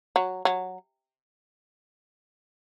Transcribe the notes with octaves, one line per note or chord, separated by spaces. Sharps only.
F#3
F#3